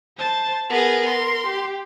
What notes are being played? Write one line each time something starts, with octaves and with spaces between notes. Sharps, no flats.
C5 A5
B3 G#4 A#4
C6
G4